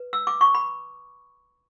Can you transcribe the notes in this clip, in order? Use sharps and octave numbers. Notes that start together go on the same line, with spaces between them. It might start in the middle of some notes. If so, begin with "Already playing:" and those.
Already playing: B4
E6
D6
C#6
B5